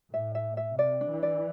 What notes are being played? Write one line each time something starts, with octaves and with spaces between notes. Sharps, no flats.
A2 E5
E5
E5
C3 D5
D4
E3
D5